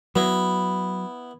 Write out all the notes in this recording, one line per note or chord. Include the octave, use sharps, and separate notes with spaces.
F#3 B3 E4